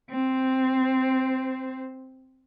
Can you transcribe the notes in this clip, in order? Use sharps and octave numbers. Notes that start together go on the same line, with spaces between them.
C4 C5